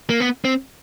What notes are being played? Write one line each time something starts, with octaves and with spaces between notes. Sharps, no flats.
A#3
B3
C4